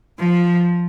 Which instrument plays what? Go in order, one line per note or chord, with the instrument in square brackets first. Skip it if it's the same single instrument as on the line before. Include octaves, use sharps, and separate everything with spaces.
[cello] F3